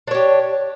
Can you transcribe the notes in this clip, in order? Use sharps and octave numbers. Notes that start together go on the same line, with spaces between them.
D4 G4 C#5